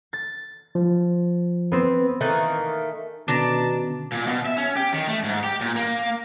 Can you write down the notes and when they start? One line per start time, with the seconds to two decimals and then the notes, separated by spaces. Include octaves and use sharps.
0.13 A6
0.75 F3
1.72 B3 C4
2.21 D#3 E3 A3 A#3
3.28 B2 D3 D#3 C#4 D4 A5 A#5
4.12 A#2
4.27 B2
4.46 E5
4.57 C#4
4.76 G4
4.94 D#3
5.07 A3
5.24 G#2
5.44 G4
5.61 A#2
5.76 A#3